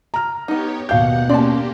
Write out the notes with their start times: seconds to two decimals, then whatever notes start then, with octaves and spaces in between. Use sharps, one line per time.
0.14 A#5 F6
0.48 B3 D#4 G4 C#5
0.89 D#2 B2 G4 F5 F#5 G6
1.29 A#3 C#4 G4 D5 A5 C6